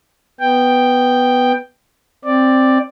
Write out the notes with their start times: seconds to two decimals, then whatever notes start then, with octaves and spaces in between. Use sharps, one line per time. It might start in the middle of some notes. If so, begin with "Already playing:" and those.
0.40 B3 G5
2.24 C4 D5